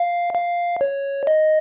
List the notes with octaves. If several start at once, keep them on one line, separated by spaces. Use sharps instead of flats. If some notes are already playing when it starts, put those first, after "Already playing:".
Already playing: F5
F5
C#5
D#5